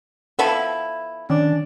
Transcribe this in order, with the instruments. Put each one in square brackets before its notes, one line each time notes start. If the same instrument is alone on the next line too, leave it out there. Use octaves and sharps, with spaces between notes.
[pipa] F3 B3 E4 [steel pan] A4
[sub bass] D#3 [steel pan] C#4 [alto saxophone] D4